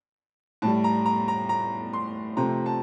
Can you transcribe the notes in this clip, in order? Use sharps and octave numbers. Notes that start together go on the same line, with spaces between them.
A2 G3 A5
A#5
A#5
A#5
A#5
C6
C3 F3 A3 A#5
A5